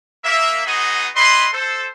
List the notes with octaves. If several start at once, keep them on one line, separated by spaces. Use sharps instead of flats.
A#3 E5
B3 D#4 F#4 G#4 D#5 D#6
E4 B4 D#5 B5 C6
A4 C5